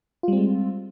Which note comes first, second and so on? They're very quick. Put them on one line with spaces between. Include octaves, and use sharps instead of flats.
F4 G3 C4 G#3